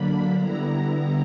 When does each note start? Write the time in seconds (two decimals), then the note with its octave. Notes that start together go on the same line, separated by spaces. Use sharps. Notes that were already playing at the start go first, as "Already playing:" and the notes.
Already playing: D3 F#3 A#3 D4 B5
0.32 D3 G3 B3 E4 A#5